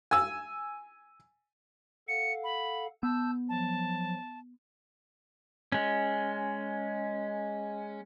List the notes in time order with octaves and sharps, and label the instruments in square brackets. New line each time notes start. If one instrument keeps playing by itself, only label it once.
[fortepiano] G#5 E6
[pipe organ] A4 F5 F#5 [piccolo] C#7
[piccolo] B5
[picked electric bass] B3 [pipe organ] A5 G6 [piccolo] E6
[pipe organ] F3 F#3 [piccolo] A5
[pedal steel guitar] G#3 C#4